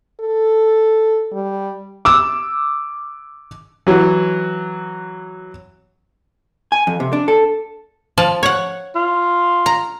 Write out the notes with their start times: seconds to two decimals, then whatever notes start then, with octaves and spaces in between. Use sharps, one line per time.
0.20 A4
1.32 G3
2.05 D6 E6
3.87 E3 F#3
6.72 G#5
6.87 F2
7.00 C3
7.13 D4
7.28 A4
8.18 F3 A5
8.43 C#5 F#5
8.95 F4
9.66 A#5